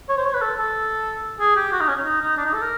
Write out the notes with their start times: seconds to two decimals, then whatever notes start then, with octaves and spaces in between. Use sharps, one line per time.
0.09 C#5
0.17 C5
0.25 C#5
0.34 B4
0.42 A4
0.58 A4
1.40 G#4
1.56 G4
1.72 F#4
1.80 D#4
1.88 C#4
2.05 D#4
2.21 D#4
2.37 D4
2.45 D#4
2.54 A4
2.62 A#4